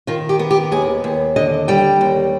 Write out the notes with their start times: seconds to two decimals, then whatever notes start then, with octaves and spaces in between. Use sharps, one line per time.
0.07 D#3 F4
0.29 G4
0.39 B3
0.51 G4
0.71 D#2 G#4
1.04 D#2
1.36 D3 D#5
1.68 G3 G5
2.01 D#2